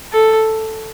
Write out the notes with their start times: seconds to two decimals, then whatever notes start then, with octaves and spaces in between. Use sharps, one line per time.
0.12 A4